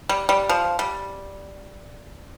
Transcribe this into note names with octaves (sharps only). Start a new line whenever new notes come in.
G3
G3
F3
G3